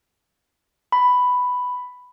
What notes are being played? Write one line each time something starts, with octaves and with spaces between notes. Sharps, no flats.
B5